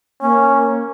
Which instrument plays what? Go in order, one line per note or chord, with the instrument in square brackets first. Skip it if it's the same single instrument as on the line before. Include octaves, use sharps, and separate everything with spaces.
[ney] A#3 [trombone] C#4